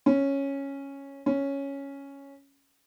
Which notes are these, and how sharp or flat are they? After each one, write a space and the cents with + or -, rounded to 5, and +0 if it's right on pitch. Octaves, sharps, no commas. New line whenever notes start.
C#4 -5
C#4 +0